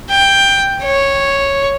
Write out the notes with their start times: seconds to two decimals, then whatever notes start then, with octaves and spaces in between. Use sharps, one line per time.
0.11 G5
0.83 C#5